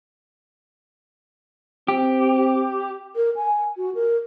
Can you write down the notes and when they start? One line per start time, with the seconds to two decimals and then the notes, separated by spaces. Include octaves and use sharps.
1.88 C4 G4
3.16 A#4
3.36 G#5
3.77 F#4
3.95 A#4